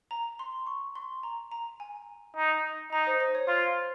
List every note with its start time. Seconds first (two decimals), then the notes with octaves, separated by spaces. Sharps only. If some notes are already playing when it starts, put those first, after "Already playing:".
0.11 A#5
0.39 C6
0.67 C#6
0.95 C6
1.23 A#5
1.51 A#5
1.80 G#5
2.36 D#4
2.92 D#4 A#5
3.07 C5
3.20 C5
3.35 C#5
3.48 F4 C5